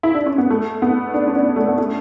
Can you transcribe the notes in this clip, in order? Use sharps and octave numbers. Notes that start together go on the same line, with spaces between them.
E4
D4
C#4
B3
A3
B3
D4
C#4
D4
A3
B3
A3